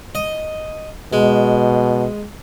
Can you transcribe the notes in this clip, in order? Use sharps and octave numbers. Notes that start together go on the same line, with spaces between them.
D#5
B2 G#3